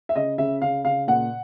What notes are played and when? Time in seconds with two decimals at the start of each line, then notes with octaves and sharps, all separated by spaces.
0.09 E5
0.16 C#3 D#5
0.38 C#3 E5
0.62 C#3 F5
0.84 C#3 F5
1.08 A#2 F#5